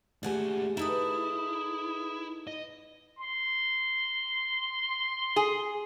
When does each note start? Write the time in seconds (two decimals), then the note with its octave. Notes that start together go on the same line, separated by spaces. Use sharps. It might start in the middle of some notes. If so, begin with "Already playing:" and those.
0.23 D#2 A3 G4 G#4 D5 F#5 G#5
0.77 D#4 E4 G#4 A4 B4 D#6
2.47 D#5
3.18 C6
5.36 G#4